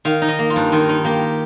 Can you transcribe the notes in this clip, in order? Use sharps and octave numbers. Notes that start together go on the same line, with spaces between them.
D#3 F5
D#4
D#5
A#3
F4
G2
D#3 F4
D#4
A#3 G4